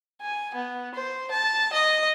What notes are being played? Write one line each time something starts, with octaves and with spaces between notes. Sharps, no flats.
G#5
B3
C5
A5
D#5